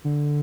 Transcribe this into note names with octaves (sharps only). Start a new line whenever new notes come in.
D3